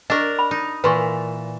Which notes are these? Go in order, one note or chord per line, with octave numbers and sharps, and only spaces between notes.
D4 A#4 D#5 C#6
B5
D#4
A#2 E3 B4 C6 C#6